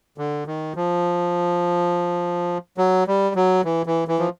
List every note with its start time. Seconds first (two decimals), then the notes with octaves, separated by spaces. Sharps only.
0.18 D3
0.47 D#3
0.76 F3
2.78 F#3
3.07 G3
3.35 F#3
3.65 E3
3.86 E3
4.08 E3
4.19 F3